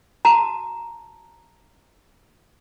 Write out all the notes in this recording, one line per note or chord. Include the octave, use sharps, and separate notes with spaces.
F#4 A5 A#5